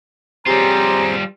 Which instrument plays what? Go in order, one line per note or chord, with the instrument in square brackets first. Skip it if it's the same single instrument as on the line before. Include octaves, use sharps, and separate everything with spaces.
[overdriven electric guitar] G3 F4 [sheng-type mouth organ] C4 G#4 C5 [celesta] G4 C#5 [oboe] A#5